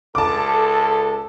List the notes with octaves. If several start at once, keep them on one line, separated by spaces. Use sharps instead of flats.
C#2 A4 A5 D6